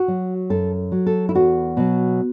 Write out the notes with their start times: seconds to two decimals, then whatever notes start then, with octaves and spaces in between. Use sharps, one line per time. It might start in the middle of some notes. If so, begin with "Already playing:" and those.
Already playing: F#4
0.08 F#3
0.50 F#2 A4
0.92 F#3
1.06 A4
1.29 E4
1.35 E2 F#4
1.77 B2 F#3